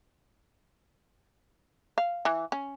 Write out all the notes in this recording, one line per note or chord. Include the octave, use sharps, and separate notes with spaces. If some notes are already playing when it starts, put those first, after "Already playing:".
F5
E3
C#4